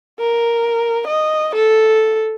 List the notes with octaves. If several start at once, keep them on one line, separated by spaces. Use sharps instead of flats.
A#4
D#5
A4